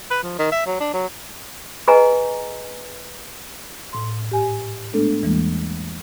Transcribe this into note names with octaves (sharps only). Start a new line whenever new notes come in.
B4
F3
D#3
E5
F#3
D4
F#3
G#4 B4 D#5 F#5 G#5 A#5
A2 C6
G#2 G4 G#5
G#3 A3 B3 D4 A4
E2 E3 G3 G#3 A#3